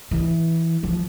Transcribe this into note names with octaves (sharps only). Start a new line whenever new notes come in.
E3
F3